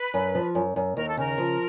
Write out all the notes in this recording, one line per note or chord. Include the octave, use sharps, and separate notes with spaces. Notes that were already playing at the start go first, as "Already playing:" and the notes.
Already playing: B4
F#2
F3
F#2
F#2
D#2 A#4
A4
C#3 A#4
F3